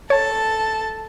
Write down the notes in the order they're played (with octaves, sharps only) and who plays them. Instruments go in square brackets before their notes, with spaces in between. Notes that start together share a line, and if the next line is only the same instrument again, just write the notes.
[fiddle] A4 A5 [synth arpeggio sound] C#5